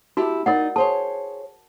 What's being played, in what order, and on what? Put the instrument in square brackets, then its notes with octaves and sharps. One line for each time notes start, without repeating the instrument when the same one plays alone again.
[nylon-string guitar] E4 G4 A5 [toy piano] F#4
[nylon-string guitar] D#4 D5 [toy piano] A#4 D#5 F#5
[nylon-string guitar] G#4 C5 C#5 [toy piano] A5